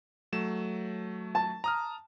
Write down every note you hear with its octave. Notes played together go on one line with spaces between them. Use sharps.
F#3 A3 E7
A5
A#5 D#6 F6